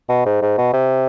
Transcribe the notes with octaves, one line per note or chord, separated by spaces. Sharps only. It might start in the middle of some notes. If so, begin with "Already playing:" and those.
B2
G#2
G#2
B2
C3